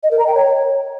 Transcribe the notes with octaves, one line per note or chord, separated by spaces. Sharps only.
D#5
A#4
A#5
G5
C#5